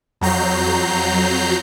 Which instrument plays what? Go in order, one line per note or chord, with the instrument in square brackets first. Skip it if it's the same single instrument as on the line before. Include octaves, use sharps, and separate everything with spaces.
[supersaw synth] F2 F#3 A#5 G6 C7